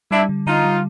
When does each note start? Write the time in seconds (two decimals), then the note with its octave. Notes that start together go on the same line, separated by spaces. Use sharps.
0.11 G3 D4 E4
0.29 D3
0.47 D3 D#4 F4
0.64 G3